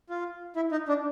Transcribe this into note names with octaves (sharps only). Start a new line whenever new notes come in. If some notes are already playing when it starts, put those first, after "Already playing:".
F4
E4
D#4
D4